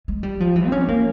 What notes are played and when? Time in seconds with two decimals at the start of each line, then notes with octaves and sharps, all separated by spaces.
0.08 G#3
0.23 G3
0.40 F3
0.56 E3
0.66 C4
0.72 C#4
0.88 A#3